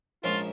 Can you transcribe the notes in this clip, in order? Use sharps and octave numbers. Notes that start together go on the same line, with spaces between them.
A#1 G#2 F3 A#3 C#4 F4